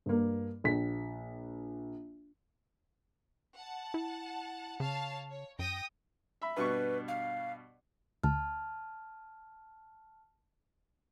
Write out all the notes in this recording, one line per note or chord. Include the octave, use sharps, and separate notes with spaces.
G2 A#3
A#1 B6
F#5 A5
E4
C#3 C#5 F5 A5
C#5
F#2 G5 D#6 A#6
E5 B5
G2 B2 B4 C#6
F5
D2 A5 F6